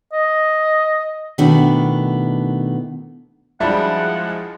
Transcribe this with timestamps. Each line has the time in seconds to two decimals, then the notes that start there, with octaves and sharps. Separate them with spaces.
0.13 D#5
1.38 B2 D#3 A3 B3 D4 E4
3.60 F#2 F3 G3 G#3 D4 E4 F#5